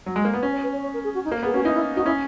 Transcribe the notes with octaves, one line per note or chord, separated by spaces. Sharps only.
F#3
G#3
A#3
B3
C#4
C#5
B4
C#5
C#5
A#4
G#4
F#4
D#4
A#3
B3 G#4
C#4 F#4
D#4 E4
E4
D#4 F#4
C#4 E4